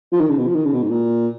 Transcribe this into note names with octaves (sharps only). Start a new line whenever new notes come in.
F3
D#3
C#3
B2
F3
D#3
C#3
B2
G#2
A#2